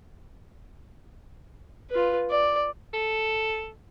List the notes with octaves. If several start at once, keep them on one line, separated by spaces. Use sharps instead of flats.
F4 B4
D5
A4